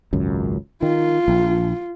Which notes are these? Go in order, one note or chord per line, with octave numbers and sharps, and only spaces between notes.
G#1 C#2 F#2
D#3 F4
A#1